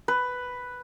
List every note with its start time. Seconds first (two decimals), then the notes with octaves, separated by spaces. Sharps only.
0.08 B4